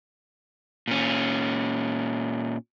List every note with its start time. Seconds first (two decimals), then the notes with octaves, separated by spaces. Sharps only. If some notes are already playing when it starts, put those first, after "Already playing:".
0.88 A#2 C#4